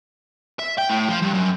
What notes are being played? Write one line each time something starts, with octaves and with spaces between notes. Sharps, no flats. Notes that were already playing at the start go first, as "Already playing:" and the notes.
E5
G5
A2
F3
G2
F#2